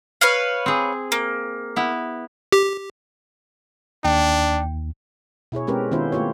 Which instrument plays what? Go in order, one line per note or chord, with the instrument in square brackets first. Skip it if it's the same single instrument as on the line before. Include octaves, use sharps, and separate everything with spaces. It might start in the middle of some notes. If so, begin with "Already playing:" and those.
[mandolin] B4 C#5 F5
[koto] C4 G#4
[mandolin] A#3
[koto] B3 E4
[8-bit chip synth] G4
[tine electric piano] D#2 [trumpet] D4 [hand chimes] G5
[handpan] B2 E4 G#4 C#5
G#3 C4 C#4 G4 A#4 B4
D#3 B3 C#4 E4 F4 C5
A3 A#3 F4 G4 C#5